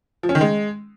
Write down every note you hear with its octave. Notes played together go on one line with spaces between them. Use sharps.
F3
C#4
D#3
G#3